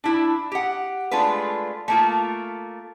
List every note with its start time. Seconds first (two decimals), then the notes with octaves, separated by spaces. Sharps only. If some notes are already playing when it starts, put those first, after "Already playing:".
0.04 D4 E4
0.52 G4 F#5
1.11 G#3 A3 D4 F4 B4
1.88 A3 A#3 F4